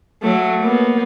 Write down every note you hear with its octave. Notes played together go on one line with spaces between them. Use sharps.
F#3 A3
A#3 B3